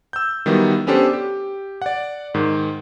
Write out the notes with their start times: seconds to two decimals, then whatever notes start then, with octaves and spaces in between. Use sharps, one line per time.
0.13 E6 G6
0.46 D#3 F#3 G3 B3 E4
0.87 B3 C#4 D4 G4 A4 C5
1.13 G4
1.82 D5 F#5
2.34 G#2 D#3